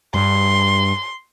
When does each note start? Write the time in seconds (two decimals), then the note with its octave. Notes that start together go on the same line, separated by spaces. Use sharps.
0.14 G2 C6